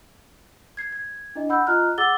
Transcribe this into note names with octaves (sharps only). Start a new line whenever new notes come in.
G#6 C7
G#6
D4 E4 D#5
F#5 B5 E6 G6
F4 D#5 A#5 F6 F#6
G#4 F#5 D6 E6 A6 G7